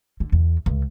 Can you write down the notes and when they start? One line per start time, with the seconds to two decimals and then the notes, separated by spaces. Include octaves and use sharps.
0.20 D3
0.32 E2
0.66 C#2